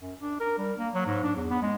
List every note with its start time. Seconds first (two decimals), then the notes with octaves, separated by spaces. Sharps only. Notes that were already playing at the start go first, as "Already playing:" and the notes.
0.02 F#2
0.20 D4
0.40 A#4
0.58 G3
0.78 A#3
0.94 F#3
1.06 G#2
1.24 D4
1.36 E2
1.50 B3
1.62 G#3